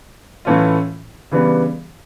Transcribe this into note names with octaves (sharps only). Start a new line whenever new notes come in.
A2 E3 A3 C#4 F4
C#3 E3 G3 B3 D4